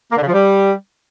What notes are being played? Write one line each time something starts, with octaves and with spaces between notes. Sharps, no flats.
A#3
D3
C#3
F3
G3